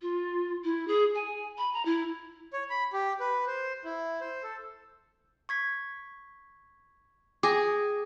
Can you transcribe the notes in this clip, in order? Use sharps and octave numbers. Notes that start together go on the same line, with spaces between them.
F4
E4
G#4
G#5
B5
A#5
E4
C#5
B5
G4
B4
C5
E4
C5
A4
C#6 G#6 B6
G#4 G5 D6 D#6 A#6